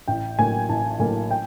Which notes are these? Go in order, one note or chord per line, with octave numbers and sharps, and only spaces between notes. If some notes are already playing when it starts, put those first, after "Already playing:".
A1 G5
A2 F#3 A#3 G#5
A1 A5
A2 F#3 A#3 G#5
G5